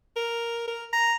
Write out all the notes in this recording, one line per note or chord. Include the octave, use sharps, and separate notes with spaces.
A#4
A#4
A#5